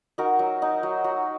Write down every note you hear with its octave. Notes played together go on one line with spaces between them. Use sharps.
D#4 F#4 A#4
F#3
D#4
F#3
F#3 F#4